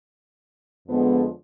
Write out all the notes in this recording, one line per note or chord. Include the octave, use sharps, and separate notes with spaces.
F2 D3 F3 G#3 B3